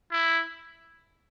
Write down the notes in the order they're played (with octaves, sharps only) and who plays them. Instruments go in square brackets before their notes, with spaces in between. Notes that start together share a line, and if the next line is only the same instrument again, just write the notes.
[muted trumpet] E4